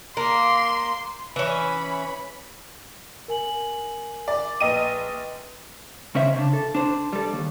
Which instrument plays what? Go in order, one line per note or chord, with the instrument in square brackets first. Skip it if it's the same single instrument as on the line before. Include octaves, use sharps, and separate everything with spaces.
[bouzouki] A#3 [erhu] C6
[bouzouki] E3 C#4 [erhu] B5
[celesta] A#4 G#5 F#7
[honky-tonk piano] D5
[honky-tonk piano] A#1 D#5 D#7 [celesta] B4 G5
[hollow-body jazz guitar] C#3 C#4 C5 E5
C#3 D4
A4
D4 C5
G3 A4
D#2